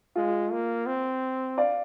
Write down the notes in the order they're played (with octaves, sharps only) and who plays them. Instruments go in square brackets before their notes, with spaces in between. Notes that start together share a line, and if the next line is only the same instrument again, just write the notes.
[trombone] G#3 [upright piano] F4
[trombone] A#3
C4
[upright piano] D5 F5